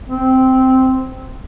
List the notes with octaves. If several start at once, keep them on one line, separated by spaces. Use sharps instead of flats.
C4